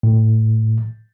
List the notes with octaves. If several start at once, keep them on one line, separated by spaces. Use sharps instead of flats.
A2